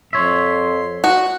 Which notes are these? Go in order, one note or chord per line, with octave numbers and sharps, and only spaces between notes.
F2 C#5 E5 C6
F#4 F#5